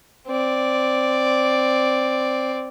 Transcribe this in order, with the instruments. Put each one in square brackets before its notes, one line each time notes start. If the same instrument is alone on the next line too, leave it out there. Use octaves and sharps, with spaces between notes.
[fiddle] C4 D5